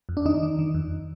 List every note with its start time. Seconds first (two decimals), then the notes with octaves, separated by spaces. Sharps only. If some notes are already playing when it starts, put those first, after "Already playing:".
0.09 F2
0.17 D4
0.26 D#3 D#4
0.43 D#3
0.59 D#3
0.74 F2